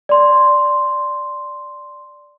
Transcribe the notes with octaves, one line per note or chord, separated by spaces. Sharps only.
D5 C6